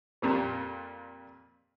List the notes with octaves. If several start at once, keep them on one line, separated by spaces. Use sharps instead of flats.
F2 A#2 G3